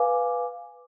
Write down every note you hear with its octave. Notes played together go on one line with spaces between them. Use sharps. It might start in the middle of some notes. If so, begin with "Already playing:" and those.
Already playing: B4 F5 G#5 D6